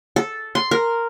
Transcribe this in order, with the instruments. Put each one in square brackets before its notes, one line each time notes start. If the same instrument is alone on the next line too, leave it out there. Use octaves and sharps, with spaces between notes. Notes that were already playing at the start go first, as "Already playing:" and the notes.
[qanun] A4
C6
A#4